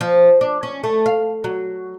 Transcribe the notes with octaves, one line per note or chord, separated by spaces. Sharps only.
F3
D4
C#4
A3
F5
F#3